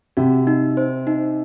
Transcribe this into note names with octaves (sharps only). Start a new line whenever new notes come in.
C3 F#4
D#4
C5
D#4